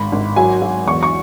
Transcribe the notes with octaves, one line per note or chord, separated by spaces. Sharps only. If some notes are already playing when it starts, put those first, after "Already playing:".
Already playing: G#1 B5
G#1
F#3 G#5
F#3
E2 C#6
C#6